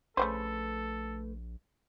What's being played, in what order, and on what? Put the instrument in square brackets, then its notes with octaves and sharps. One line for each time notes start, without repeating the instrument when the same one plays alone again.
[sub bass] A#1 [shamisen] C#3 A#3 C5 [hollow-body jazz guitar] A3 B4 [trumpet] A4